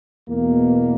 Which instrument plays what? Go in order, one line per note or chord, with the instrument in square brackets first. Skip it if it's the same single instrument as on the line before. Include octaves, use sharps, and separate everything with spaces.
[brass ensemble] E2 B2 A#3